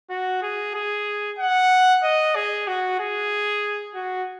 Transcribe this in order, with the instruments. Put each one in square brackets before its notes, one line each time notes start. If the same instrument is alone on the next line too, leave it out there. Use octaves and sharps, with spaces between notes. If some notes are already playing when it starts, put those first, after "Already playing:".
[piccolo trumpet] F#4
G#4
G#4
F#5
D#5
G#4
F#4
G#4
F#4